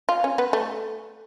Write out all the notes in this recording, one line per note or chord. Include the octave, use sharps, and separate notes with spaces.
F4
C#4
B3
A3